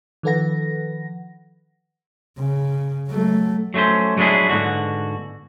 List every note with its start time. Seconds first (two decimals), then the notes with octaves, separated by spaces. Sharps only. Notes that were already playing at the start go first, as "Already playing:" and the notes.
0.23 D#3 F3 A4 B4 F#5 A#6
2.38 C#3
3.08 F#3 A3
3.74 F#3 A3 C4 C#4 C5
4.18 F#3 G#3 D4 E4 G#4
4.49 G#2 B2 D3 F#4